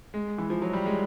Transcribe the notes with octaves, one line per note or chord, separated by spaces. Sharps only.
G#3
E3
F3
F#3
G3
G#3